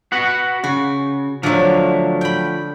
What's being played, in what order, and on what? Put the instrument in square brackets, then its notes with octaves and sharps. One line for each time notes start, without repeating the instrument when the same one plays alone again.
[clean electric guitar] F#4 B4 F#5
[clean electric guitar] C#3 [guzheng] F#4
[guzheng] D3 F#3 [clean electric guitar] F3 A3
[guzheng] G5 B5